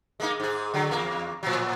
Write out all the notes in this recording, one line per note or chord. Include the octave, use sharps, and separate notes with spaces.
G#3 A#3 D#4
G#2 G#4
D3 F#3
E2 A#3
A2 F3 F#3